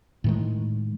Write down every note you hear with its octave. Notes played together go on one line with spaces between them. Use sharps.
A2 D#3 G#3